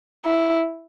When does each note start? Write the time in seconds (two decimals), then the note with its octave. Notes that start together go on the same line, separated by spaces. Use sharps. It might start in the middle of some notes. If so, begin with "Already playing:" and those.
0.25 E4